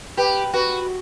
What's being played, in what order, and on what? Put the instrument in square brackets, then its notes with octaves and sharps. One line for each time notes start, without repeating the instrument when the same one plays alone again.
[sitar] G4 [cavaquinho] B4
[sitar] F#4 [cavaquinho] B4